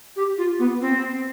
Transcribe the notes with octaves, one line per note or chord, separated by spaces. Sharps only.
G4
F4
B3
C4